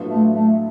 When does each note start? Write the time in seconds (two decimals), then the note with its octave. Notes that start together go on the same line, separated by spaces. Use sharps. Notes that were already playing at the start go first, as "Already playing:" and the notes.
Already playing: A2 F#3 B3 D4 F4
0.10 A3
0.34 A3